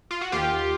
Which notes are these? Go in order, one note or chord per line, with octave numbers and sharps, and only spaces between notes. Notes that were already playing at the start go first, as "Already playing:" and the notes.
F4
F#4
D#2 F4 G4